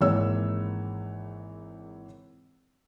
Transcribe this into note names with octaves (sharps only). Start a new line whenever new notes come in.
G#1 E3 G#3 A#3 C#5 E6